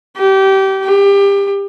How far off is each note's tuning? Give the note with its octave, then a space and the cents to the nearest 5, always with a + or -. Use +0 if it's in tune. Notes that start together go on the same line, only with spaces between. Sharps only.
G4 -25
G4 +25